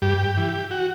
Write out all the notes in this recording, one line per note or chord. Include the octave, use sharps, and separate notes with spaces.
G2 G4
E3
F#4